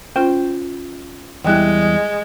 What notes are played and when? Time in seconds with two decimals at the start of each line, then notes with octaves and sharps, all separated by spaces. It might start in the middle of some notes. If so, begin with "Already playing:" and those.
0.16 C#4 F4 C5 G5
1.45 E2 G3 G#3 E4 G5 F#6